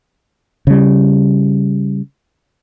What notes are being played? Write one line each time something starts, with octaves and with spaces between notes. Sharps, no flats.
C#3 G3